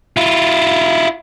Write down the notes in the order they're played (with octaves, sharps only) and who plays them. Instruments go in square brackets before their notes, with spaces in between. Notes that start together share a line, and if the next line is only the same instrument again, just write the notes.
[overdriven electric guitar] E4 F4